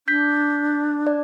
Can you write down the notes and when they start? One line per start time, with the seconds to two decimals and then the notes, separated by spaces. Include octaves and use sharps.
0.08 D4 G6 B6
1.07 D5